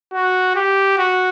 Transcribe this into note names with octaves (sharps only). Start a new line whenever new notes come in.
F#4
G4
F#4